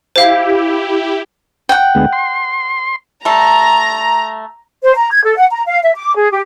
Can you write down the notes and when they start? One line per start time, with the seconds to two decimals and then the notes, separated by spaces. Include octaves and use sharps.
0.16 E4 G4 C5 F5
1.69 F#5 G5
1.95 D2 G#3 B3
2.13 C6
3.25 G3 A3 A#5
4.83 C5
4.96 A#5
5.11 G#6
5.24 A4
5.37 F#5
5.51 A#5
5.66 F5
5.83 E5
5.97 D6
6.15 G#4
6.31 G4